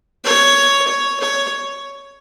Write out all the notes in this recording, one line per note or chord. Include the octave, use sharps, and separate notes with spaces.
C#5
C#5
C#5